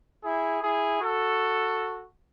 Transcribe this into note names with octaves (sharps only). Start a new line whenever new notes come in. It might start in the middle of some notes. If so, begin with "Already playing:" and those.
E4 G#4
E4 G#4
F#4 A4